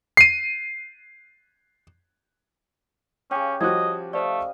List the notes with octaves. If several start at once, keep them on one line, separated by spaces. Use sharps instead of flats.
C7 D#7
C#3 C#4 G4 C#5 G5
F3 G3 F#4 D#5 F#6 G#6
A3 C5 D5 D#5 F5